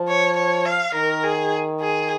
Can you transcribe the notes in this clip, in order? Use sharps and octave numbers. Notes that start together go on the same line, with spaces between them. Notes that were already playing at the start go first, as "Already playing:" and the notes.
Already playing: F3
C#5
C#5
F5
D#3 A#4
G#4
G#4